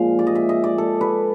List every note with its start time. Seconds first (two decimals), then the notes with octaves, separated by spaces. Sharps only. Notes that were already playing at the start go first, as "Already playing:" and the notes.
Already playing: A#2 F3 G#3 F5
0.19 D5
0.27 D#5
0.35 E5
0.49 D#5
0.64 D5
0.78 A4
1.01 B4